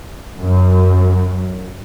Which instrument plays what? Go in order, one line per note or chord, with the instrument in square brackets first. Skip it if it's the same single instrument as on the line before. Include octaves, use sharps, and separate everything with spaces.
[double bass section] F#2